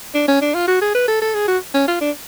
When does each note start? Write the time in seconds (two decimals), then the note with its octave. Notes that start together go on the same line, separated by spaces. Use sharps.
0.14 D4
0.28 C#4
0.41 D4
0.54 F4
0.68 F#4
0.81 G#4
0.94 B4
1.08 A4
1.22 A4
1.34 G#4
1.48 F#4
1.74 C#4
1.88 F4
2.01 D4